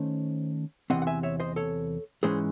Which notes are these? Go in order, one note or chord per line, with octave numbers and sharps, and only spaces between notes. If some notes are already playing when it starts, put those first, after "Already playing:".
Already playing: D#3 A3 C#4 C5
E2 C3 E3 C4 D#5 F#5
F#5
E5 G#5
C#5 E5
C5 D#5
A4 C#5
G#2 E3 G#3 C#4 G#4 C5